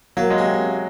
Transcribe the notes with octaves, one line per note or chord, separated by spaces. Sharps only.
F#3 A#3
G#3
C3